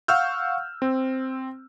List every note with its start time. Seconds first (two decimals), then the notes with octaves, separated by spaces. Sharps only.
0.08 F5 F#5 C#6 E6 F6 G6
0.82 C4